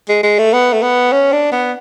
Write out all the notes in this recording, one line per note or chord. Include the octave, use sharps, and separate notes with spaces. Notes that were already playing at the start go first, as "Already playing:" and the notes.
G#3
G#3
A3
B3
A3
B3
C#4
D4
B3